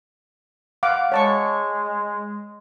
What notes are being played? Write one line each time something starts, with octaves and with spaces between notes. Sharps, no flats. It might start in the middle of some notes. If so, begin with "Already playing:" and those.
F5 F#5 D6
G#3 C#5 A5 C#6